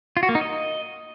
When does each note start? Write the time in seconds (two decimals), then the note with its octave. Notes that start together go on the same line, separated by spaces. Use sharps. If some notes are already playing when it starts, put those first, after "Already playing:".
0.17 F4
0.23 F#4
0.29 A#3
0.35 D#4
0.41 D#5